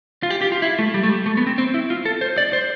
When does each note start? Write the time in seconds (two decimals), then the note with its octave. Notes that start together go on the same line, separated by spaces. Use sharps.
0.23 F4
0.30 G4
0.41 G4
0.52 F4
0.62 E4
0.79 A3
0.94 G3
1.03 A3
1.09 G3
1.26 A3
1.37 B3
1.47 C4
1.58 C4
1.74 E4
1.90 F4
2.06 A4
2.21 C5
2.38 D5
2.53 C5